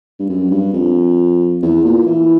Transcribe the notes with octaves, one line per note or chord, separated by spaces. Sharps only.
G2
F#2
G2
F2
E2
A#2
E3